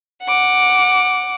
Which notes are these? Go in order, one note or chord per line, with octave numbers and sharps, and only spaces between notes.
F#5 D6